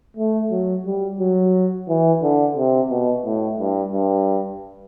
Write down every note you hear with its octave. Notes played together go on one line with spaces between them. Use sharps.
A3
F#3
G3
F#3
E3
D3
C3
B2
A2
G2
G2